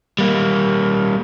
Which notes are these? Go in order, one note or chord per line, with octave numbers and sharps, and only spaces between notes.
G3 A#3